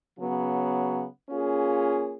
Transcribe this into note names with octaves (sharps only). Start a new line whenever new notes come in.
C#3 F#3 B3
A#3 C#4 F4 G#4